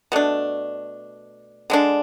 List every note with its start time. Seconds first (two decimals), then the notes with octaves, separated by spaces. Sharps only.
0.12 B2 A3 D4
1.70 D3 G#3 D4